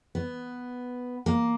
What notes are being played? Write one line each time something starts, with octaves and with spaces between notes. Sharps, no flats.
B3
A#3